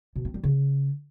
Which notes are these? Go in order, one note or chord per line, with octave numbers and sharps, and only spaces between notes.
B2
C4
G3
C#3